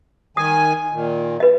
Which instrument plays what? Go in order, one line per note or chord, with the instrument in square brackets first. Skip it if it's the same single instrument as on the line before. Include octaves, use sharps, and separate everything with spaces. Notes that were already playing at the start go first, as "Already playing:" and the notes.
[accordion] D#3 G#5 [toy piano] D#6
[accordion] A#2 D#3
[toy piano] B4 D#5